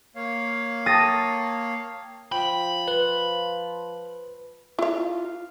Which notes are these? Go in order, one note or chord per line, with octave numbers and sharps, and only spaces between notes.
A#3 C#5 F5
G5 A5 D#6 A6 A#6
F3 G5 B5
B4
E4 F4 F5